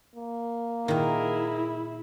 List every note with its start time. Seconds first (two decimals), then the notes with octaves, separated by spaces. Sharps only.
0.15 A#3
0.88 A#2 D#3 E4 G#4 A#4